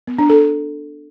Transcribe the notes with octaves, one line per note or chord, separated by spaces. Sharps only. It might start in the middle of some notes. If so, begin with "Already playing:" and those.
B3
D4
A4